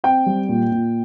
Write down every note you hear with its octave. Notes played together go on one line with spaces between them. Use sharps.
C4 G5
G3
A#2
A#2